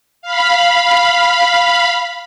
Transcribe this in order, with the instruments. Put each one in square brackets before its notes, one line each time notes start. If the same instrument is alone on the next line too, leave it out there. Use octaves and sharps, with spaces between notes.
[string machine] F5 B5